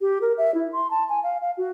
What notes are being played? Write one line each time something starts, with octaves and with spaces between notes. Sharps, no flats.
G4
A#4
E5
E4
C6
A5
G#5
F5
F5
F#4